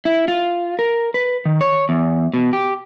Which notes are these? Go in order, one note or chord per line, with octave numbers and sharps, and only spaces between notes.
E4
F4
A#4
B4
D#3
C#5
E2
B2
G4